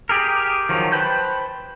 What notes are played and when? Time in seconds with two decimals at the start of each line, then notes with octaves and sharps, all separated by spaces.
0.09 G4 G#4 A#4
0.69 D#3 F3 F#3
0.92 B4 C5 G5 A5 G6